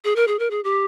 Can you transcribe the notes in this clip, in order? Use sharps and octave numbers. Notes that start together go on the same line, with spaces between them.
G#4
A#4
G#4
A#4
G#4
G4